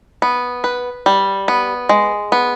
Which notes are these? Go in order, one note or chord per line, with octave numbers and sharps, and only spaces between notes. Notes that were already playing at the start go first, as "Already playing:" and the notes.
B3
B4
G3
B3
G#3
B3